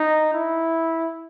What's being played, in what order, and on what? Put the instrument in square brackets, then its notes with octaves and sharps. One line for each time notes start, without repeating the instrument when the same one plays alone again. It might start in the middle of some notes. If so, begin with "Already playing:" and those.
Already playing: [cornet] D#4
E4